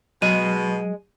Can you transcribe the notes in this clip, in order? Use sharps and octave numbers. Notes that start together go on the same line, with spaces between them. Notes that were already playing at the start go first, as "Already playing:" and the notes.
B2 F#3 G#3 D#7